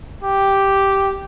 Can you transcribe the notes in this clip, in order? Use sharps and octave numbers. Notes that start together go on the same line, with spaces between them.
G4